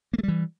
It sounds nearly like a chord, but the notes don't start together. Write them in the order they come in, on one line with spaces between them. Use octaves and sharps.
A#3 A3 G3 E3